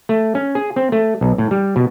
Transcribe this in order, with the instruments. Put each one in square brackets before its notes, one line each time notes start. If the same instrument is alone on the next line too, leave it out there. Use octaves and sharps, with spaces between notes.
[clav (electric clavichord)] A3
C#4
G#4
C4
A3
B1
A2
G3
B2